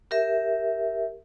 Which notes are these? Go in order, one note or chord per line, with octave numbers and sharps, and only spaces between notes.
G4 A#4 E5